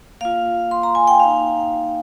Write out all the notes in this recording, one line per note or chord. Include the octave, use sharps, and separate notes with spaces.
A#3 F4 F5
C6
A#5
G#5
G5
A#3 D#4 F5